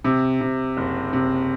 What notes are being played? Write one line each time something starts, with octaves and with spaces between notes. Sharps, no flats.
C3
C3
F#1
C3